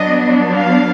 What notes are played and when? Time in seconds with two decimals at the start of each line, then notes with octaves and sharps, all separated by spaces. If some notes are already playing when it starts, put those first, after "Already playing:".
Already playing: F#3 B3 D4 D#5
0.53 F5